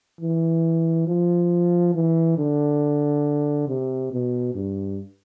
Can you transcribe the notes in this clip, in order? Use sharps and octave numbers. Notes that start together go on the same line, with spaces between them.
E3
F3
E3
D3
C3
B2
G2